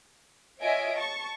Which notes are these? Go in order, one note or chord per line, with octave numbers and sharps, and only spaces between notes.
F4 C#5 D#5 E5 G#5 D7
A5 C#6